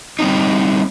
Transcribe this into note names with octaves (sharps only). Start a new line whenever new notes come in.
G3 A3 C4 C#4 D#4